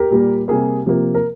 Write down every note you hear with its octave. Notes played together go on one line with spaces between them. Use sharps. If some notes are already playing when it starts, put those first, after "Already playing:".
Already playing: G4 A#4
A#2 G3 A#3
C3 G3 A#3 G#4
C3 F3 A#3
A#4